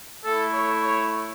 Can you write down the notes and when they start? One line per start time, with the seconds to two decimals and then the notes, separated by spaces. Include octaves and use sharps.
0.24 A3 E4 A4
0.54 C#5
0.84 C#5